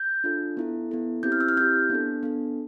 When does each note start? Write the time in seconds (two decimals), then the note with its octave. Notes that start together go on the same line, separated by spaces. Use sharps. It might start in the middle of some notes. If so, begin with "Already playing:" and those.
Already playing: G6
0.24 D4 F4 A4
0.57 B3 E4 A4
0.91 B3 E4 A4
1.23 C4 E4 G4 G6
1.32 F6
1.41 E6
1.49 F6
1.57 C4 E4 G4 G6
1.90 B3 D4 A4
2.23 B3 D4 A4